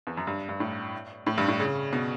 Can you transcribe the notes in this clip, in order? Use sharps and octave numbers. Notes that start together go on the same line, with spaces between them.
E2
F#2
G2
G2
A2
A2
G2
A2
C#3
B2